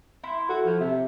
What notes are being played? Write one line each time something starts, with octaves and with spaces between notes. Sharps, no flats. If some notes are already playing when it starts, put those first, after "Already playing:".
E4 C6
F#4 A4
F3
C3 E5